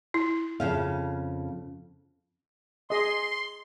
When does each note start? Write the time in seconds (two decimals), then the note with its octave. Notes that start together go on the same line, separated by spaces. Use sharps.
0.14 E4
0.60 F2 C#3 F5
2.90 G#4 D#5 C6